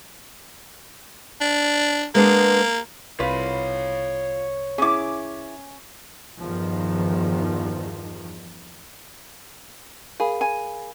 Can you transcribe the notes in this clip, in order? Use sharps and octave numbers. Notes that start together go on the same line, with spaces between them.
D4
G#3 A#3 B3 D4
C2 F4 B4 C#5 B5
C#4 E4 G#4 D6
E2 G2 D#3 F3
G#4 A#4 F5 B5
G#5